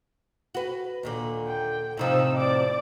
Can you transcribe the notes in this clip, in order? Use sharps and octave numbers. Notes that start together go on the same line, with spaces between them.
F#4 B4
D#2 A#2 D3
G5
A2 C3 F3 D#4 E6
D5 D6